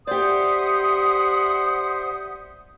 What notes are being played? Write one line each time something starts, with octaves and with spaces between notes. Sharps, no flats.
G4 C5 D5 E5 F#5 D#6